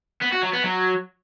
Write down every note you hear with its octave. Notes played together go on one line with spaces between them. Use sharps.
B3
F#4
F#3
B3
F#3